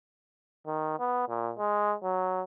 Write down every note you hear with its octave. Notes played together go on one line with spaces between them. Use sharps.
D#3
B3
A#2
G#3
F#3